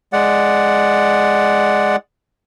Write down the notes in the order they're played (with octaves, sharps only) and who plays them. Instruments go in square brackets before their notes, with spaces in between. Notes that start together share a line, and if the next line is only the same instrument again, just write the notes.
[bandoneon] G#3 D5 F#5